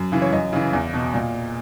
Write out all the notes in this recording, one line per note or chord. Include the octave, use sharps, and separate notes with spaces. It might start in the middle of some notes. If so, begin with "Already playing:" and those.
Already playing: F#2
C#3 E3
C#5
F#2 D#5
C#3 E3
E2
B2
A#2